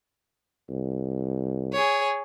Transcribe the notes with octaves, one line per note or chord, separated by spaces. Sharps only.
C2
G#4 C#5